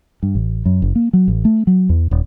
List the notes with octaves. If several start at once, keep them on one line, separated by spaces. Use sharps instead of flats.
G2
A1
F#2
F#1
A#3
F#3
A1
A3
F#3
E2
D#1